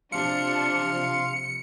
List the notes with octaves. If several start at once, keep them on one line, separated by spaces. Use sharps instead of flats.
C3 F3 D4 F5 C6 C#7